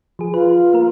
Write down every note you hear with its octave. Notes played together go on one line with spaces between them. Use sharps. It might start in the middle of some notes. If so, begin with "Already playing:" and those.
F3 G#4
F4 B4
A#3 A#4